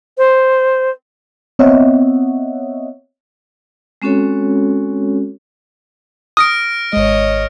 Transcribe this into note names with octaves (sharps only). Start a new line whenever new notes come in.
C5
B3 C4 C#5 D#5 E5 F#5
G#3 C4 C#4 F#4 A4 C#5
D#6 F6 A#6 D7
G#1 G#3 C#5 D#5